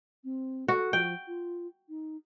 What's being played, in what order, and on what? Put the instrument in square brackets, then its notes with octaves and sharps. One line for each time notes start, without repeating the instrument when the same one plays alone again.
[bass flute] C4
[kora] F#4 [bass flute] A4
[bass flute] F3 [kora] G5
[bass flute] F4
D#4